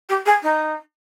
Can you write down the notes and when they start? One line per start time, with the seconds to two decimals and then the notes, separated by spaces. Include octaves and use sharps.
0.09 G4
0.26 G#4
0.43 D#4